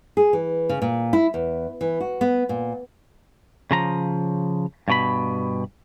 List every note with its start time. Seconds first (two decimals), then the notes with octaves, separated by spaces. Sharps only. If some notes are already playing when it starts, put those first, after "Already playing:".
0.17 G#4
0.33 E3
0.69 C#3
0.82 A#2
1.13 E4
1.34 E2
1.81 E3
2.00 F#4
2.21 B3
2.49 A#2
3.71 C#3 F3 A#5
4.88 G2 B2 B5